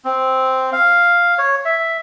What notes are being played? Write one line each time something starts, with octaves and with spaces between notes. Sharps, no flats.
C4
F5
C#5
E5